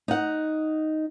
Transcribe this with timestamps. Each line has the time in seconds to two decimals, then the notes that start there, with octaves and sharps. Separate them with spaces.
0.08 D#4 F#5